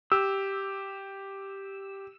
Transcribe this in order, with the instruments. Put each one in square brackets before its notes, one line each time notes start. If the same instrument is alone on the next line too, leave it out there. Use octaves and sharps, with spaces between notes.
[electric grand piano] G4 [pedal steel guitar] E6